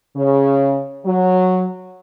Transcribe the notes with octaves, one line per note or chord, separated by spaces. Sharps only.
C#3
F#3